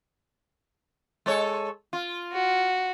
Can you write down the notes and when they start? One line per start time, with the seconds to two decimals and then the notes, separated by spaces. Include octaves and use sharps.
1.26 G#3 A4 C#5
1.93 F4
2.32 F#4